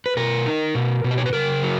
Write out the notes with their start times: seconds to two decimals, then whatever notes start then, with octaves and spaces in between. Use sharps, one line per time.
0.06 B4
0.17 B2 A#4
0.46 D#4
0.75 B2
1.04 B2
1.11 D#5
1.18 C#5
1.26 B4
1.33 C#3 A#4
1.63 F#3